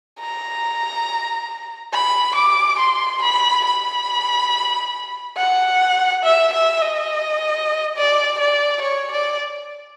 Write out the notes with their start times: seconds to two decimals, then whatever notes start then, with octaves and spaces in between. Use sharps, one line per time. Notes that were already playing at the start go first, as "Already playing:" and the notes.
0.20 A#5
1.93 B5
2.36 D6
2.79 C6
3.22 B5
3.65 B5
5.37 F#5
6.23 E5
6.53 E5
6.81 D#5
7.97 D5
8.39 D5
8.82 C#5
9.12 D5